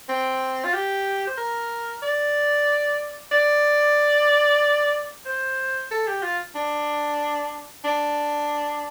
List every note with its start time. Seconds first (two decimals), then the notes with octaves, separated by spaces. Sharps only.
0.09 C4
0.64 F4
0.73 G4
1.27 C5
1.37 A#4
2.02 D5
3.32 D5
5.25 C5
5.91 A4
6.07 G4
6.23 F4
6.55 D4
7.84 D4